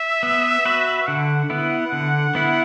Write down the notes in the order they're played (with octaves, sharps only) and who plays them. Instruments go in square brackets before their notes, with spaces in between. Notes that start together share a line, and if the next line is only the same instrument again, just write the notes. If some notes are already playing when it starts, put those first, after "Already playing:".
Already playing: [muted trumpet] E5
[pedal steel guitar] B3
F#4 B4
[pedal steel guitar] D3 [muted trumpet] F#5
[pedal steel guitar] B3 E4
D3
B3 E4